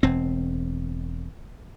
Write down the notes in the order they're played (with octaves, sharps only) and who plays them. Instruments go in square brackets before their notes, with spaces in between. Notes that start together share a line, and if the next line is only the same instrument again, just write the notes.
[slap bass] E1 C4